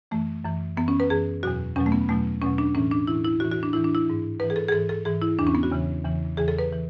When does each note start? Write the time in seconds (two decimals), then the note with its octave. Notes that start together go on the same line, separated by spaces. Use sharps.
0.11 F#2 E3 A3
0.44 F#2 E3
0.77 F#2 E3 B3
0.88 C#4
1.00 B4
1.10 F#2 E3 G#4
1.43 E2 B2 F#3 F#4
1.76 E2 B2 F#3 C#4
1.86 A3
1.92 B3
2.09 E2 B2 F#3 A3
2.42 E2 B2 F#3 C#4
2.58 D4
2.75 A2 E3 C#4
2.91 D4
3.07 A2 E3 E4
3.25 E4
3.40 A2 E3 F#4
3.52 F#4
3.63 D4
3.73 A2 E3 E4
3.84 D4
3.95 E4
4.07 G#2 E3
4.39 G#2 E3 B4
4.50 G#4
4.56 A4
4.68 G#4
4.72 G#2 E3 A4
4.89 A4
5.05 G#2 E3 G#4
5.22 E4
5.39 E2 C#3 E3 D4
5.47 C#4
5.55 B3
5.63 F#4
5.72 E2 C#3 E3
6.05 E2 C#3 E3
6.37 E2 C#3 E3 G#4
6.48 A4
6.59 B4
6.72 E3